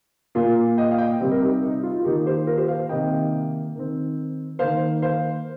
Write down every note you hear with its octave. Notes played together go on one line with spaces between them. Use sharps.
A#2 A#3 F4
D#5 G5
F5
D#5 G5
C3 G3 C4 G4
A#4
D#4 G4
D#4
F4
F4
D#3 A#3 D#4 G4
G4 C5
F4 A#4
G4 C5
C5 F5
C3 D#3 A#3 D#5 G5
D#3 C4
D#3 A#3 C5 F5
C5 F5